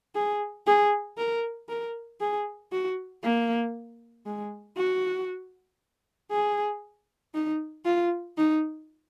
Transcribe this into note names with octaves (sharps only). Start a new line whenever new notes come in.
G#4
G#4
A#4
A#4
G#4
F#4
A#3
G#3
F#4
G#4
D#4
F4
D#4